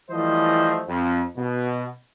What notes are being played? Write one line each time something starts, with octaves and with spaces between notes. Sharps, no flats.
E3 F3 G3 A3 C5 D#5
F2
B2